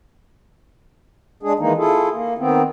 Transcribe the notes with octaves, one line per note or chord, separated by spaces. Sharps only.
G#3 D4 G#4
D#3 E3 G#3 A#3 D#4
E4 F4 G#4 A4
A#3
D#3 B3 C4